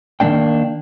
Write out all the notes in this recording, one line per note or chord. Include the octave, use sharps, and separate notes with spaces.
D#3 G3 A#3 D4 G5